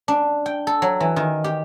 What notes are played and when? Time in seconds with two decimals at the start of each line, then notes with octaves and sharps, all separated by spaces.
0.08 D4
0.46 G5
0.67 A4
0.82 F#3
1.00 E3
1.16 D#3
1.44 G4